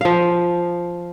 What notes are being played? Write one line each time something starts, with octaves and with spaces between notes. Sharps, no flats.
F3 F5